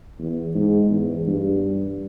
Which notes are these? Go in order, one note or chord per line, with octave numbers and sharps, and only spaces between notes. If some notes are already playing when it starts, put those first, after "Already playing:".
E2
G#2
E2
G2